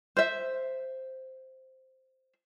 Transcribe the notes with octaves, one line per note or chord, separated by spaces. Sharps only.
C5 E5